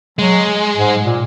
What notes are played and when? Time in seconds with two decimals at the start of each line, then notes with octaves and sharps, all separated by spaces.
0.19 F#3 G#3
0.76 G#2
1.04 A#2